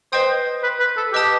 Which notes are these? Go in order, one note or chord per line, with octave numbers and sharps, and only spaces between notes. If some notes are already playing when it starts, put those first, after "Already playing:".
B4 C5 D#5 G5 D#6
B4
B4
A4
G4 B4 D#5 A5 D#6